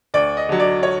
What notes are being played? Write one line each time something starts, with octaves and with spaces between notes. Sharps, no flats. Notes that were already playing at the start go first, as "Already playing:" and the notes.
D2 D5
D#5
D3 F#3
D5
C#5